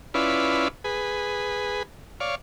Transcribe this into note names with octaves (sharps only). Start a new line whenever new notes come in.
C#4 E4 F4 B4 D5
G#4 B4
C#5 D5 F5